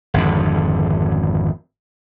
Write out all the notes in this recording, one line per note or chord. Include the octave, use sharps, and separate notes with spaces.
G#1 F2 D3